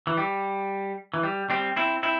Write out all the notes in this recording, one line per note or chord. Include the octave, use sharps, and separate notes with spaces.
E3
G3
E3
G3
G3 C4
C4 E4
C4 E4